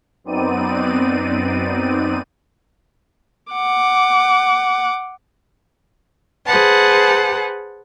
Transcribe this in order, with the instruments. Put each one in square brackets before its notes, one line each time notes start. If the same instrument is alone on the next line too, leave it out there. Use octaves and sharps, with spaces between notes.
[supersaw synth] F#2 B3 C4 D#4 D5 D#7
[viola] F#5 D6
[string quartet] G#4 B4 C5 F#5 A5